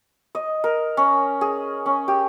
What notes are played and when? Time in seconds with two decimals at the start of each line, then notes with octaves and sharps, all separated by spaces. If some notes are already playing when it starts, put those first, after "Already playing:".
0.35 D#5
0.64 A#4
0.97 C#4
1.41 G#4
1.86 C#4
2.08 G4